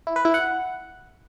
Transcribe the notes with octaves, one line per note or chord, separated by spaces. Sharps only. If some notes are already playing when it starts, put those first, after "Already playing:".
E4
B4
E4
F#5